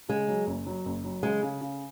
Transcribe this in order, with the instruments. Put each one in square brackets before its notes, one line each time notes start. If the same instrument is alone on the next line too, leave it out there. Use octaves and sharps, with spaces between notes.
[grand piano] C#3 [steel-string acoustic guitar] G#3
[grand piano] F#3
F#1
F#3
F#1
F#3
[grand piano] C#3 [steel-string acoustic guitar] G#3
[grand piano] C#3
C#3